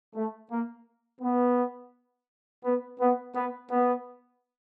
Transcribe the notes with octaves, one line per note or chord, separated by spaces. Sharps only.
A3
A#3
B3
B3
B3
B3
B3